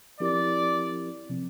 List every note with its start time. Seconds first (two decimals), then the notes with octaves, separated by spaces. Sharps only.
0.20 F3 C4 E4 G4 A#4 D5
1.30 C3 F3 C4